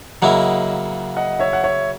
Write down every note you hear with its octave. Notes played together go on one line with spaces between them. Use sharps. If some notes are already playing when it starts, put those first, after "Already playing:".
C#3 F#3 A#3 E4 D#5 F#5
D#5 F#5
C#5 E5
F#5
C#5 E5